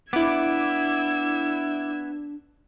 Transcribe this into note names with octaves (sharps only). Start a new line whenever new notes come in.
B3 D4 E4 D6 E6 G#6